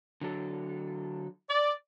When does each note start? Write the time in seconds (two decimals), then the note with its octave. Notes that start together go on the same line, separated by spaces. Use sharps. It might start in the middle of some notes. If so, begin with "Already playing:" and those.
0.21 D3 F#3 A4
1.50 D5